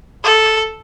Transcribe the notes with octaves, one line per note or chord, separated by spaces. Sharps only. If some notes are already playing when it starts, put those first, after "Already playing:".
A4